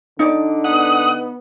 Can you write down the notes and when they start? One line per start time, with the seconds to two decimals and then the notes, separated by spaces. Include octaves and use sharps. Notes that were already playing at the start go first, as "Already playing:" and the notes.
0.19 D3 D#4 D5
0.64 B3 F#5 D#6